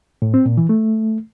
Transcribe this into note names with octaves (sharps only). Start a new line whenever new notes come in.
A2
C4
A#2
E3
A3